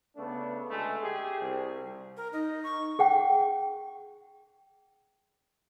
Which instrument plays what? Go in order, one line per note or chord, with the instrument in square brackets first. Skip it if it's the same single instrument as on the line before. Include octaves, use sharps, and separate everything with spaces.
[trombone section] C#3 A3 B3 D4
D2 G#3 A3
G4 G#4
C2
[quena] A#4
[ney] D#4 [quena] D#5
[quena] C#6
[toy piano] G#4 F#5 G5